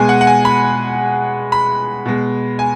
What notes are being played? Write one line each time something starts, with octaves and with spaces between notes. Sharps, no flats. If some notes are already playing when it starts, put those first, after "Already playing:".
Already playing: B2 G#3 G#5
F#5
F#5
G#5
B5
B5
B2 G#3
G#5